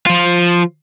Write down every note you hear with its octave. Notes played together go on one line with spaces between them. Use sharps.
F3 F4